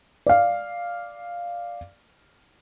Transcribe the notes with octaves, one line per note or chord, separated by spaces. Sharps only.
D5 F5